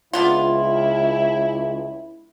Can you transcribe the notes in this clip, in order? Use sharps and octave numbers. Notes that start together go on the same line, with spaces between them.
C#2 B3 D4 E4 F4